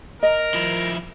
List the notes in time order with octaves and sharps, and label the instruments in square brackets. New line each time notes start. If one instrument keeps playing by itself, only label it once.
[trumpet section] A#4 [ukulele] D#5
[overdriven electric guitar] F3 E4